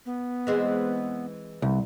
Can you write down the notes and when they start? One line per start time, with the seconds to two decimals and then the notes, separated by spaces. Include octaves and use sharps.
0.06 B3
0.47 E3 G#3 C4
1.62 C2